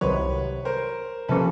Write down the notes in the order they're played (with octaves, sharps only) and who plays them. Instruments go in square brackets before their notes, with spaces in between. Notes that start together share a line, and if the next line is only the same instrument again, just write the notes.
[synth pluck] C2 C3 D#3 F#3 [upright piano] B4 C#5
[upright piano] A#4 C5
[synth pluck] C3 F3 A#3 C#4 [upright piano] A4 B4